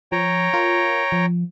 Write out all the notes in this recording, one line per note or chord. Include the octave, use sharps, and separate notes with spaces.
F3 C#5 G5 A#5
F4 A#4
F3